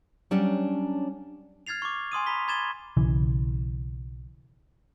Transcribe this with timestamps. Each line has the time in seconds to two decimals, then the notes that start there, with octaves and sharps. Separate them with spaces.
0.31 F#3 G3 C#4 D4
1.67 F6 G#6 A6 C7 F7
1.82 C#6 D6
2.12 G#5 C6 D#6 D#7
2.26 A#5 B5 C#6 B6 G7
2.48 B5 D6 G#6 A6 E7 G7
2.97 B1 C#3 E3